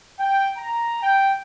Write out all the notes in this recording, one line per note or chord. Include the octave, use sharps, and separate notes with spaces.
G5
A#5
G5